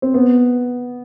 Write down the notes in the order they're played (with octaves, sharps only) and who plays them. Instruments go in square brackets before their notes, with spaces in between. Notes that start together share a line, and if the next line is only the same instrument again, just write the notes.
[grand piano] C4
B3